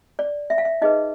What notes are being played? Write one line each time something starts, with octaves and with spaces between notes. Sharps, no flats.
D5
E5
F5
E5
D#4 G#4 B4 D#5